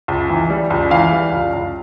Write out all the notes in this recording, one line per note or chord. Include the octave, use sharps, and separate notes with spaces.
C#2
E3
G3
C#2
E3 F5
G3
C#2
C#2